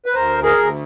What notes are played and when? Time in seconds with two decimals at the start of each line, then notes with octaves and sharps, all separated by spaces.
0.06 B4
0.14 D2 A#4 C5
0.43 G#4 A#4
0.58 D2